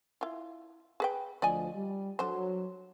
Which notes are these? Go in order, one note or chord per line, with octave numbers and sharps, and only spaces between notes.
E4 F4
G#4 B4 G5
D2 F3 D5 D#5 G#5
G3
D3 F#3 C5